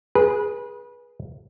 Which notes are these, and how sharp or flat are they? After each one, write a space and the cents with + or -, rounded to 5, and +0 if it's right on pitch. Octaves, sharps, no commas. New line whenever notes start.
G#4 +0 B4 -30